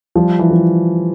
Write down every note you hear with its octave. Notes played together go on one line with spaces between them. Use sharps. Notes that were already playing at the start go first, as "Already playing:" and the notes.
F3 G3
E3
F3